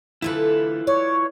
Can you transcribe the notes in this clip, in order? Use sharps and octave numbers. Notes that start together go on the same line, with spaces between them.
D3 A3 E4 F4 A4 B4
C#5 D5